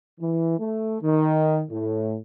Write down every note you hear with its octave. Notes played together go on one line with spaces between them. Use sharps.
E3
A3
D#3
A2